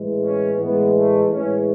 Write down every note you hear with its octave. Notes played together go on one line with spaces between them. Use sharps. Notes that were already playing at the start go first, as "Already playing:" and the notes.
Already playing: A2 E3 G#3
C#4
A2 E3 G#3 B3
A3
A2 E3 G#3 C#4